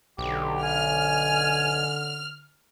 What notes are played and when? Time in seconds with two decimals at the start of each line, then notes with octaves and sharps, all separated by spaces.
0.18 B1 D3 G4
0.63 G#5 F6